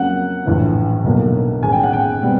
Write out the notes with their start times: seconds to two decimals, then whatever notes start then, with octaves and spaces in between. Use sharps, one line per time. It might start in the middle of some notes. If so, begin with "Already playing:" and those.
Already playing: F2 C#3 F#3 A#3 F#5
0.45 A#1 A2 E3
1.04 B1 B2 F#3 A#3
1.61 A1 G#2 D#3 G#3 C#4 G#5
1.72 G5
1.83 F#5
1.93 G5
2.22 B2 G3 C4